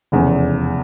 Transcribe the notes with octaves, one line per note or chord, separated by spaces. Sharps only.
F1 E2 C#3